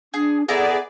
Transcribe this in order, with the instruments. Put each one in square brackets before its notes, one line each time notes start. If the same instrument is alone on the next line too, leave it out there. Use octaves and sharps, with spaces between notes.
[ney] D4 [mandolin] G#4
[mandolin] B3 E4 A#5 [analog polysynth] G#4 D5 [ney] A4